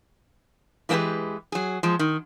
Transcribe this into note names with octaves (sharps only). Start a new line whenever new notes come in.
E3 G#3 A#3 D4 G4 B4
F#3 G#4
F3 G#3
D#3